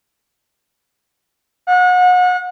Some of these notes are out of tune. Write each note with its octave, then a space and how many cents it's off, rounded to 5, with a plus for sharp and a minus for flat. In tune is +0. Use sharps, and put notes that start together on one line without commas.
F#5 -35